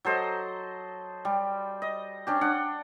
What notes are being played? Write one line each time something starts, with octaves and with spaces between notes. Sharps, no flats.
F#3 A4 C5 D#5
G3
D#5
C#4 D4 G4
D4 F#5 G5